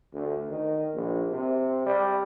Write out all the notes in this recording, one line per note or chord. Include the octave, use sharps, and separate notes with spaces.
D2
D#3
A#1
C3
G3